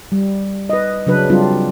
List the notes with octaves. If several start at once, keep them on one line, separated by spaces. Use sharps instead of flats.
G3
B4 D#5
C#3 F#3 D4 B4
F#3 G3 C4 D4 F4